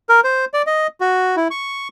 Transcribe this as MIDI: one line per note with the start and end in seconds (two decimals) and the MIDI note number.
0.09 0.20 70
0.24 0.45 72
0.54 0.62 74
0.67 0.87 75
1.00 1.36 66
1.36 1.48 64
1.51 1.88 85